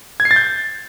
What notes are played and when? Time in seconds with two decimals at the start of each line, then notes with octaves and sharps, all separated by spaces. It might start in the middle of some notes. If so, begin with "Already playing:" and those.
0.20 G#6
0.25 C7
0.31 A6
0.36 G6